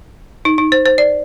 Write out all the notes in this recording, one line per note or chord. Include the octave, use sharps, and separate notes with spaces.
D#4
D#4
C5
C5
D5